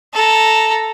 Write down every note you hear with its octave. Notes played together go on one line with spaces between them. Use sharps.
A4 A#5